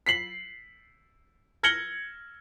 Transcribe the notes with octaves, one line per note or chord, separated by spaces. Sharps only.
B6 C7 F#7
F6 G#6 A#6 C#7 F#7 G7